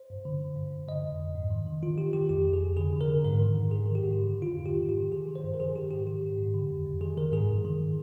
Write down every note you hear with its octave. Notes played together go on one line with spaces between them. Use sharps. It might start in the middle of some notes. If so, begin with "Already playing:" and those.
Already playing: C5
G2
D3
D3
G2
G2
D3 D#5
F2
F2
G#2
D#3
D#3
D#3 F4
D#3 G4
D#3 G4
F2 G4
F2
G#4
F2
D3 G#4
D3
A#4
D3
G#2 A#4
D#3
G#2
G#2 G#4
D#3
G4
G#2
D3
D3
F4
F2
D#3 G4
G#2
G4
D#3
D#3 G#4
D#3
C5
G2
A#4
D#3 G#4
D#3 G4
G#2 G4
D#3 G4
G#2
G#2
D3
F2
F2
D#3 G#4
D#3 A#4
G#2 G#4
G2
D#3